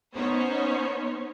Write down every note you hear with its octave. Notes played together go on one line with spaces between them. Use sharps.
B3 C#4 D#4 C5 C#5